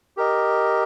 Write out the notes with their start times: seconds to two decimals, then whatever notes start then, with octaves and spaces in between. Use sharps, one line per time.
0.17 G4 A#4 D#5